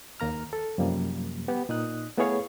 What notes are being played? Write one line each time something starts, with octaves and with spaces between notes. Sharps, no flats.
D#2 A#3 A#5 F6
A4
F#2 C3 F3 G3 A#3
B3 G4
A#2 D#4 D#6 F#6
A3 B3 E4 G#4 C#5 F5